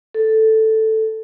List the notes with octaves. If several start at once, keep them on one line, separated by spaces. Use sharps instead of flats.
A4